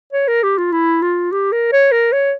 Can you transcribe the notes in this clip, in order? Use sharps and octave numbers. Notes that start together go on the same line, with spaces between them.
C#5
A#4
G4
F4
E4
F4
G4
A#4
C#5
A#4
C#5